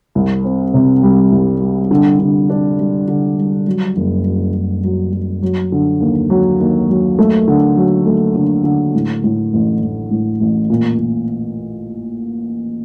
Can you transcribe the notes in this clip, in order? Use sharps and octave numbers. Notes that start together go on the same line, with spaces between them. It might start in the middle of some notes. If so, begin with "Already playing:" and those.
C2
C4
C3
G3
C2
G3
D3
D3
D4
G3
D3
G3
F#3
F#1
F#3
F#1
F#3
F#3
F#3
D3
D#2
F#3
D#2
F#3
A3
D3
F#3
A3
D3
D3
A2
A2
A1
A1
A2
A1
A#2
A#2